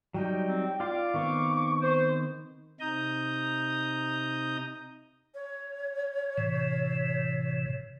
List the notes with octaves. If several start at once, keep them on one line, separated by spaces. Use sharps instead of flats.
F#3 G3 D#4 G5
C4
F4 D5 F5 C6 D6
D#3 B3 C4 C#6
C5
C3 D#4 A#5 D#6 G6
C#5
A2 C3 E3